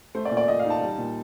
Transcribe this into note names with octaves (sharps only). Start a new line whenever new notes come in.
A3 C5
D5
A#2
D5
A#2 D#5
F5
D#4
A5
G3
A#2